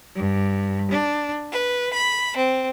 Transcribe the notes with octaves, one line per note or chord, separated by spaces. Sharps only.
G2
D4
B4
B5
C4